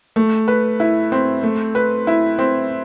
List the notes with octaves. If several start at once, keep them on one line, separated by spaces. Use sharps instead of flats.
A3
B4
E4
C4
A3
B4
E4
C4